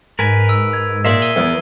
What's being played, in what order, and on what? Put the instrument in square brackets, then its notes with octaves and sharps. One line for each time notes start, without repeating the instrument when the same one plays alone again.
[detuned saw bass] G#2 [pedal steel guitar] A#4 B4 G#5
[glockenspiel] E6
G#6
[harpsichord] A#2 [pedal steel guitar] G#4 A#4 E5 [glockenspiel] C7
[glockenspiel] E6 D#7 G7
[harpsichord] E2 [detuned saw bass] B3